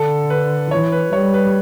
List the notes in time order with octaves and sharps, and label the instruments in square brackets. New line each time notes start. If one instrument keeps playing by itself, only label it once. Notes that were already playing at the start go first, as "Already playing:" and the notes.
Already playing: [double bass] D3 [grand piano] A4
[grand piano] B4
[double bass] E3 [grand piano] C#5
[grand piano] B4
[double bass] G3 [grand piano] C#5
[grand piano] B4